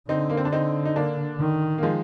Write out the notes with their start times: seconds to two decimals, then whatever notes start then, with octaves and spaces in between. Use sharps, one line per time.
0.09 D3 C4 D#4
0.30 A#3
0.37 C4
0.45 D4
0.53 C4 D#4
0.85 D#4
0.96 A#3 D4
1.39 D#3
1.78 A#3
1.83 F3 G#3